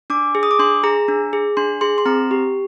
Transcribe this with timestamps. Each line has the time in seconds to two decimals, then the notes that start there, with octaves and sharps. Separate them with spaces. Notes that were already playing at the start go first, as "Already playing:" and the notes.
0.10 D4 D6
0.35 G#4
0.43 D#6
0.51 D6
0.59 D4 C6
0.84 G#4 A#5
1.08 D4
1.33 G#4
1.57 D4 C6
1.81 G#4 C6
1.98 C6
2.06 C4 A#5
2.31 G4